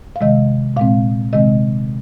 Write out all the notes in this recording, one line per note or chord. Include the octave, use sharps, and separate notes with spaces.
F5
C3 D#3 G#3 D#5
A#2 G#3 C4 F5
C3 D#3 G#3 C4 D#5